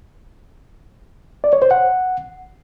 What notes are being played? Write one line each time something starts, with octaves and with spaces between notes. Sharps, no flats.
D5
C#5
C5
F#5